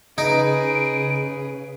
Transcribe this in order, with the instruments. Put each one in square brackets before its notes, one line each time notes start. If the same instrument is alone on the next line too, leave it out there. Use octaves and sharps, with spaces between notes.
[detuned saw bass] C#3 [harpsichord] D#4 [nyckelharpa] G#4 B4 [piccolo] D7